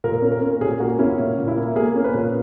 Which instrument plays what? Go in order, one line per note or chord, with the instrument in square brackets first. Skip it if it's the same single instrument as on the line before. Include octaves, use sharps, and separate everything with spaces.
[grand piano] A#2 A#4
C#4
A#4
C#4
A#2 G#4
A#3 F#4
C#4 E4
A#2
A#2
E4
A#3
A#3 G#4
C#4
B4
A#2